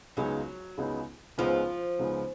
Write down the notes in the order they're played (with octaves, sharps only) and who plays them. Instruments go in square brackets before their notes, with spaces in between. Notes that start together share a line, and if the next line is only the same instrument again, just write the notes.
[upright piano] C#2 C#3 G#3 B3 D#4 [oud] F#3
[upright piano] C#2 C#3 G#3 B3 D#4
[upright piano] C#2 C#3 G#3 B3 D#4 [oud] F3
[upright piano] C#2 C#3 G#3 B3 D#4